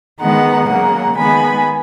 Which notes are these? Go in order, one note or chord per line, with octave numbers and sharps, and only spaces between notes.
D#3 G#3 B3 F#5 A#5
C#3 F#3 A#3 F#5 A#5
D#3 G#3 B3 G#5 B5